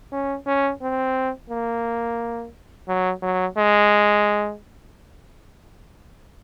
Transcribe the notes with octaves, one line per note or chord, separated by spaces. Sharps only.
C#4
C#4
C4
A#3
F#3
F#3
G#3